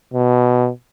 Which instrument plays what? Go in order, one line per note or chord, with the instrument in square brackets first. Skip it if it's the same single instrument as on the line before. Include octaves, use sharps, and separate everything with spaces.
[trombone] B2